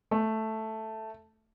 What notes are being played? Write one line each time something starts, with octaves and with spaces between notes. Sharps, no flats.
A3